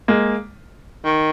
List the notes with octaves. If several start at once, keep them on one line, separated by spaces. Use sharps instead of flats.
G#3 A#3
D#3